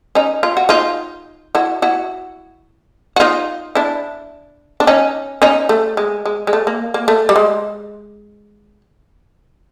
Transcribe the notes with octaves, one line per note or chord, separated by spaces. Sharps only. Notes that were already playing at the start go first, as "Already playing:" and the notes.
C#4 D#4
F4
F#4
D#4 F4
E4 F#4
E4 F#4
F#4
D#4 F4
D4 E4
D4
C#4 D#4
C#4 D#4
A3
G#3
G#3
G#3
A3
A#3
A#3
A3
G3
G#3